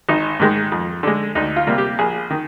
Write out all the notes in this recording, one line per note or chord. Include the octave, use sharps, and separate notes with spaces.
G#1 D#4
G#2 D#3 G#3
F2
D3 G#3
D2 D#4
F4
C3 G3 A#3
G4
A#1 G#4
D#3